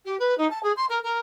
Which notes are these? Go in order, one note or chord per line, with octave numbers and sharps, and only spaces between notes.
G4
B4
D#4
A5
G#4
C6
A#4
A#4